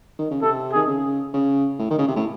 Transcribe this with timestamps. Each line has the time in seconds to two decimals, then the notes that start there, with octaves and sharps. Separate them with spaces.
0.19 D#3
0.31 C#3
0.42 C3 A4
0.73 D#3 G#4
0.87 C#3
1.34 C#3
1.79 A2
1.90 D#3
1.98 C#3
2.08 C3
2.16 A2